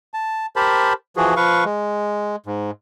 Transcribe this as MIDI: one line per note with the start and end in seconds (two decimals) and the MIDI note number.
0.14 0.46 81
0.56 0.93 67
0.56 0.93 70
0.56 0.93 72
0.56 0.93 81
0.56 0.93 83
1.17 1.34 52
1.17 1.34 53
1.17 1.34 66
1.17 1.34 68
1.36 1.64 53
1.36 1.64 71
1.36 1.64 77
1.36 1.64 85
1.65 2.36 56
2.46 2.71 44